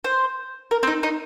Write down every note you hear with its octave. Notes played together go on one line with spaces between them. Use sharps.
C5
A#4
C4
D#4
D#4